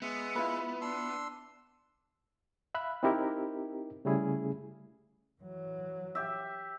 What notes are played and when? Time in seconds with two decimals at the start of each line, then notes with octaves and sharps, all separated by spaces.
0.02 G#3 B3 E5
0.35 E4 F4 B4
0.81 D4 C6 E6
2.75 E5 F5 B5 F#6
3.03 C4 D#4 E4 G4 A#4
4.05 C#3 G3 A3 C#4 E4 G#4
5.41 E3 F#3
6.15 G4 E5